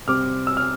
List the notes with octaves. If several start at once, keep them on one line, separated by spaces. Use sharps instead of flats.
C3 G3 C4 D6 F6
E6
F6